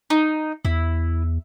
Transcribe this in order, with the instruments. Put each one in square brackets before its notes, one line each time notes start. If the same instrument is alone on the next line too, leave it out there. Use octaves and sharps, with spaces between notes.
[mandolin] D#4
[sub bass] E2 [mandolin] E4